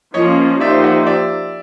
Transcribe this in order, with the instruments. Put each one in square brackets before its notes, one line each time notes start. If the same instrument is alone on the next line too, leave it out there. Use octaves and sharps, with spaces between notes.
[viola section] F3 A#3 C#4 F4 [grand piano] C#5 D#5
[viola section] F3 A#3 D#4 G4 C5 [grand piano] D5 E5
[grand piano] E5 F#5
D5 E5